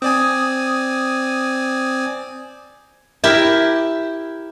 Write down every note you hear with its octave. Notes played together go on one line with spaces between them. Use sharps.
C4 D5 G#5 D#6
E4 G4 A#4